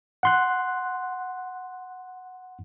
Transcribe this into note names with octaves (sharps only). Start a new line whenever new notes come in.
F#5 C6 F#6